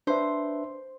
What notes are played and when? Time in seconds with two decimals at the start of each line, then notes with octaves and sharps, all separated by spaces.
0.07 D4 B4 C5 E5